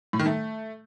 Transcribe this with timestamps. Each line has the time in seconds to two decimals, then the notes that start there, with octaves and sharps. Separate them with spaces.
0.13 A2
0.19 D#3
0.26 A3